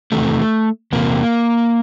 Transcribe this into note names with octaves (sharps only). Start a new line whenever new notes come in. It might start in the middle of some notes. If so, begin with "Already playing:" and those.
E2 C3 D#3 A3
E2 C3 A#3